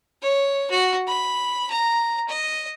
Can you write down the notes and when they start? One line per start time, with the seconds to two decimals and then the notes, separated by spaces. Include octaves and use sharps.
0.22 C#5
0.71 F#4
1.08 B5
1.71 A#5
2.29 D#5